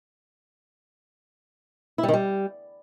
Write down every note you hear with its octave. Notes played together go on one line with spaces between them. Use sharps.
E4
G3
D#3
G3